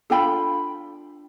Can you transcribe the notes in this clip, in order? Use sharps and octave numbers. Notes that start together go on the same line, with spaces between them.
D4 F4 A4 G5 B5